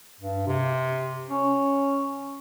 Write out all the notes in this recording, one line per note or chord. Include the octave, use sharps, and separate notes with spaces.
G2
C3
C#4